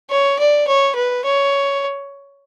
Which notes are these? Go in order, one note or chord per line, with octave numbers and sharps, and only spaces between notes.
C#5
D5
C#5
B4
C#5